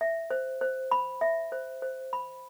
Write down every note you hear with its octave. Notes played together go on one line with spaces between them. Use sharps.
E5
C5
C5
B5
E5
C5
C5
B5